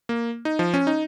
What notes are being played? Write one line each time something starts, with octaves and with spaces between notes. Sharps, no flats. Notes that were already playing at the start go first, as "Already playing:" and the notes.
A#3
D#4
F3
C#4
D#4